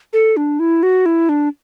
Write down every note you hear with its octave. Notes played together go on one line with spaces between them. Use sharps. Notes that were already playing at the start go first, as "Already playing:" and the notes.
A4
D4
E4
F#4
E4
D4